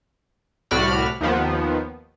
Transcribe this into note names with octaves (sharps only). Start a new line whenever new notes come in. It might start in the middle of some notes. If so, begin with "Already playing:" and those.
C2 A2 F#4 D5 B5 F6
D#2 D#3 F3 B3